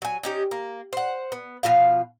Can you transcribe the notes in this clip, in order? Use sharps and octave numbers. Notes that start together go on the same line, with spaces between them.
F#3 G#5
C#4 D#4 G4
A#3
C5 F#5
B3
B2 F3 F4 F5